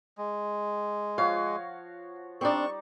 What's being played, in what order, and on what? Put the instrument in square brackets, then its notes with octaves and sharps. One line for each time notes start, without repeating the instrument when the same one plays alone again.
[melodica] G#3
[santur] F3 F#4 C#5 [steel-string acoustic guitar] F5
[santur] G3 D#4 D5 [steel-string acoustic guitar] C4 D4 [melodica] C#6